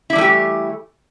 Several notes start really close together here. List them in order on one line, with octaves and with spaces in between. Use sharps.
E4 G3 E3 A3 G4